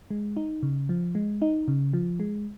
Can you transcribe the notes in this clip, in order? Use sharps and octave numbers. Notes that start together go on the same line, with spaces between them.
G#3
D#4
C#3
F3
G#3
D#4
C#3
F3
G#3